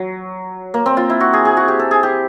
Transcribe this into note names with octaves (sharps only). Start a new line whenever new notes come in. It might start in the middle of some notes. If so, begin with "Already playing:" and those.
Already playing: F#3
A#3
C4
F4
E4
F#4
G#4
G#4
F#4
G4
A4
G#4
G4